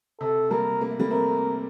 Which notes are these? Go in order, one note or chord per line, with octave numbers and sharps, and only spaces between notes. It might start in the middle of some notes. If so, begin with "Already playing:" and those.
C3 A4
G3 A#3 A#4
A#3
A3
G3 A#3
A3 C4 A#4